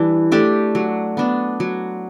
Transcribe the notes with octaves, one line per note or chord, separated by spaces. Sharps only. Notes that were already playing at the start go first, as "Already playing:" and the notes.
Already playing: E3 G3 D4
A3 D4 G4
F#3
B3 D4
F#3